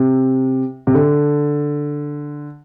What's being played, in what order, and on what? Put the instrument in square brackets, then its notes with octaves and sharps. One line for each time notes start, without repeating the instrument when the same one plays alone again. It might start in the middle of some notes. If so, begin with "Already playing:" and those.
Already playing: [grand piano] C3
C3
D3